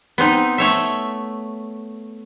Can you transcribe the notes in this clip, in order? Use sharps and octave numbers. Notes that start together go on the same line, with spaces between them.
B3 C4 D#4
A3 C#5 E5